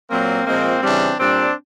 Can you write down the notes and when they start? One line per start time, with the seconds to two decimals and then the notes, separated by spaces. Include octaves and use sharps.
0.10 A#2 F#3 A#3 C4
0.47 A#2 F3 G#3 A#3 C4
0.83 C#3 E3 G3 C4 D4
1.19 A#2 G3 C4 D4